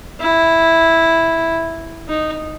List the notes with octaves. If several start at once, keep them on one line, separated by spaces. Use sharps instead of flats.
E4
D#4